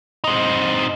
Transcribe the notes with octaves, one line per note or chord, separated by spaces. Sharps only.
C4 D#4